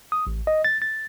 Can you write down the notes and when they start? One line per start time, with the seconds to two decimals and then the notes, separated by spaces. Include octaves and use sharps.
0.12 D#6
0.27 A1
0.47 D#5
0.65 A6
0.82 A6